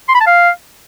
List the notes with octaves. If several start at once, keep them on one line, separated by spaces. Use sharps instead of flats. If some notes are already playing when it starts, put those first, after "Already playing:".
C6
B5
A5
F5